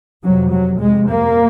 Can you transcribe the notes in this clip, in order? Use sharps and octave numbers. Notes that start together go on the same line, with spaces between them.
F2 C3 F#3
F#3
F2 C3 G#3
A#3